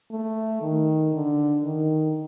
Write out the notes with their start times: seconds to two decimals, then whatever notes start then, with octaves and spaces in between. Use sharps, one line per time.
0.11 A3
0.62 D#3
1.13 D3
1.64 D#3